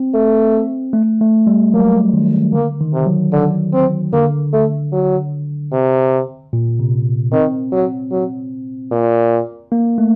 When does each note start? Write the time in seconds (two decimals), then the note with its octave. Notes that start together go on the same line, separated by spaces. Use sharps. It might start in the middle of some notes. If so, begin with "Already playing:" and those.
Already playing: C4
0.14 A3
0.93 A3
1.21 A3
1.47 G3
1.74 F#3 A#3
2.13 D#3
2.53 D3 A#3
2.81 D#3
2.94 C3
3.07 F#3
3.33 D3
3.73 C4
4.13 D3 A#3
4.53 A3
4.93 F#3
5.73 C3
6.53 A#2
6.79 C3
7.33 D#3 C4
7.72 F#3
8.12 F#3
8.92 A#2
9.72 A#3
9.98 A3